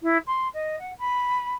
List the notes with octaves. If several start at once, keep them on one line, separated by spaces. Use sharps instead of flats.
E4
C6
D#5
F#5
B5